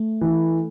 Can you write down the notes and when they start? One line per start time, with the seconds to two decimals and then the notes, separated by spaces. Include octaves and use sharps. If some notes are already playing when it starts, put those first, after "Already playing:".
Already playing: A3
0.21 E3